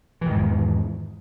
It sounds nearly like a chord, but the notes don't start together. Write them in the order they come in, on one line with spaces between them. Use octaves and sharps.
E3 D#3 G#2 E2